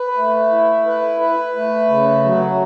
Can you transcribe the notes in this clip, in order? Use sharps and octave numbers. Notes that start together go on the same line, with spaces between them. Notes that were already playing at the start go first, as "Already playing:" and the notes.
Already playing: B4
A3
E4
B4
B4
A3
C#3
F#3